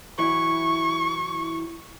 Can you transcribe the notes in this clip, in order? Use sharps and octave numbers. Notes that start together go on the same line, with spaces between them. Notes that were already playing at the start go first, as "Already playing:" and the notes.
E3 F#3 E4 C#6